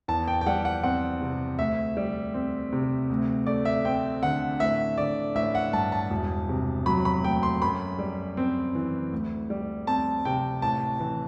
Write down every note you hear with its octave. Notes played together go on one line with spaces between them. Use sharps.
E2 A5
G5
G5
G3 F#5
F#5
C4 F#5
C3
D2 E5
G3
C4
C3
D2
A3 D5
E5
C4 G5
D3 F#5
A1 E5
D3 D5
A1 E5
F#5
G2 A5
A5
E1
C3
F#3 B5
B5
D2 G5
C6
F#2 B5
G3
C4
E3
D2
G3
C4 A5
C3 G5
A1 A5
E3